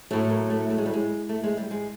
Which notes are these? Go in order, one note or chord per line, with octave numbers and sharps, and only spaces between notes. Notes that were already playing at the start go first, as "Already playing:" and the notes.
A2 F#3 A3
A#3
A3
A3
G#3
G3
G#3
A3
G#3
G3
G#3